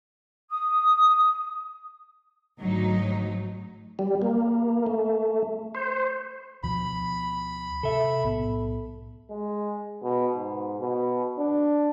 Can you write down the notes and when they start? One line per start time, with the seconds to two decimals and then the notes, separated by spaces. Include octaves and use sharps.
0.50 D#6
2.58 G#1 D2 F#3 D#4
3.99 G3
4.22 A#3
4.86 A3
5.75 C5
6.63 D2 B2 F3 B5
7.83 C3 A4 E5
8.24 B1 A2 B3
9.30 G#3
10.03 B2
10.34 G#2
10.80 B2
11.39 D4